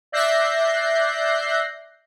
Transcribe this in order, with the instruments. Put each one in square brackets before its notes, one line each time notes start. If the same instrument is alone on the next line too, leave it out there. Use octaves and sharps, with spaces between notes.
[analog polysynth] D5 E5 F#6 G6 A#6 C7